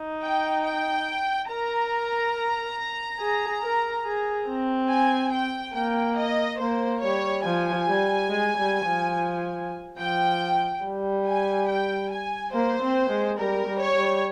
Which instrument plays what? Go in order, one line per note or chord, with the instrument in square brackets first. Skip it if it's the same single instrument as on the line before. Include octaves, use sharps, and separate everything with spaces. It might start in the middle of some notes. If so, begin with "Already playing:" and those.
Already playing: [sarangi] D#4
[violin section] G5
G5
[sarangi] A#4 [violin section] A#5
[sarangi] G#4
A#4
G#4
C4
[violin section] G#5
G5
[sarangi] A#3 [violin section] G5
[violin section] D#5
[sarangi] A#3 [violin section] C5
[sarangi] G3 [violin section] C#5
[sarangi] F3 [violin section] G#5
[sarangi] G3
G#3
G3
F3
[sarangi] F3 [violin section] G5
[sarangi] G3
[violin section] G#5
G5
G#5
[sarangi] A#3 [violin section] C5
[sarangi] C4
G#3
[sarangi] G3 [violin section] A#4
[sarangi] G3
[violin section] C#5
[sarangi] G3